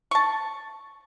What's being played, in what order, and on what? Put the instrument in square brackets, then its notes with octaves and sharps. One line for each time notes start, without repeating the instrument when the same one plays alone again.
[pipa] A5 C#6